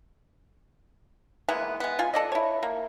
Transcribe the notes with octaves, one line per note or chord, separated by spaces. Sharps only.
E3 G#3 A#3 B3
G#3 B3
B2 F4 G#5
A4 D5 D#5
E4 C#5
A#3